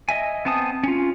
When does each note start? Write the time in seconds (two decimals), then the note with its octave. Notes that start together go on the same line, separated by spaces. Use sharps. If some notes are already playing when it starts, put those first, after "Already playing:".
0.09 D#5 E5 G#5
0.45 B3 C4 G#5 A5 D#6
0.83 C#4 F4